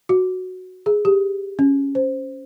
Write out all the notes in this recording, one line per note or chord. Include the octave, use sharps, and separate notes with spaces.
F#4
G#4
G4
C#4
C5